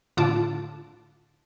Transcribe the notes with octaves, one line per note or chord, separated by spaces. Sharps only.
A2 D3 F4 A5 D6